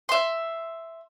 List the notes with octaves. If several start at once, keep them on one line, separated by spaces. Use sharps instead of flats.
E5 C6